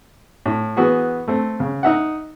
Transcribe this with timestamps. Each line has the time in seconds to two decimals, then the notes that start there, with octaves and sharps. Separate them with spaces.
0.46 A2
0.77 E3 B3 F#4 G#4
1.28 A3 C4
1.60 C#3
1.83 D#4 E5 F#5